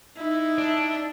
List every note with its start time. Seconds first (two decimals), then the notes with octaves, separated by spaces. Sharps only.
0.17 D#4 E4
0.58 D4